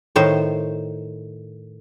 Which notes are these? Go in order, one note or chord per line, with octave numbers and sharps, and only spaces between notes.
A2 D#3 C5